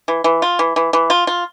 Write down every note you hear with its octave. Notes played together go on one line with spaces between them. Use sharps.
E3
E3
F4
E3
E3
E3
F4
F4